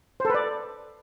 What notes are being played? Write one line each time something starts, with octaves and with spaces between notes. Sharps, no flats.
A4 B4 C5 D5